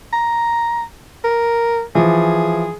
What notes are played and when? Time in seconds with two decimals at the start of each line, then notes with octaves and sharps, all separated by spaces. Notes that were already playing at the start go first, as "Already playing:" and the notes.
0.13 A#5
1.24 A#4
1.95 E3 F3 G#4